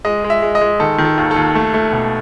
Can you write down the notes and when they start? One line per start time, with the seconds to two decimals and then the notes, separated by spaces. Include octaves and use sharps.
0.05 G#3 D#5
0.24 G#3
0.30 E5
0.42 G#3
0.55 D#5
0.61 G#3
0.80 D#3 A4
0.98 D#3
1.05 A4
1.18 D#2
1.31 A4
1.36 D#2
1.55 A3
1.74 A3
1.93 B2